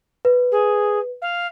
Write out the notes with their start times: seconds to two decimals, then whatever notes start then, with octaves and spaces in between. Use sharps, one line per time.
0.25 B4
0.51 G#4
1.22 F5